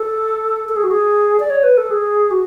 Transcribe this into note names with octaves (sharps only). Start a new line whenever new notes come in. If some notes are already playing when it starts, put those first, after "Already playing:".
Already playing: A4
A4
G#4
F#4
G#4
D5
C#5
B4
A4
G#4
F#4